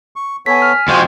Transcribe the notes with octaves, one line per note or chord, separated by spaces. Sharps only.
C#6
B3 A4 C#5 G#5 B6
F6
F2 G#3 F4 F#4 C5